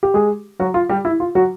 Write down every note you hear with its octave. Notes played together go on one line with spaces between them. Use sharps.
G4
G#3 G#4
F#3 F#4
F4
G3 G4
E4
F4
F#3 F#4